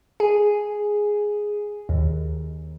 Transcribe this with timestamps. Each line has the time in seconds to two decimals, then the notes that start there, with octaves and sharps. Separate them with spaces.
0.20 G#4
1.89 D#2